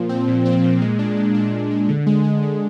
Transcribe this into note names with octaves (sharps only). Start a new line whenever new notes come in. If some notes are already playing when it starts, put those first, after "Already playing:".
Already playing: A#2 F3
C4
A#2
C4
A#2
G#3
D4
G#3
D4
A#2
G#3
D3
G#3
G#3
D3